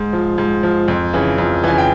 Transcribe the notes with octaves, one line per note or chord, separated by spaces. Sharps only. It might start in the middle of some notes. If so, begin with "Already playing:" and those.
Already playing: G#2
F3
G#2
F3
F2
C#3 E3
F2
C#3 E3 G#5
G5